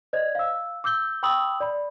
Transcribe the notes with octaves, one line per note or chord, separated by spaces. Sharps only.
C5 D5 D#5 G#6
F5 E6
D6 E6 G6 G7
G5 B5 C#6 D#6 E6 F#7
D5 B5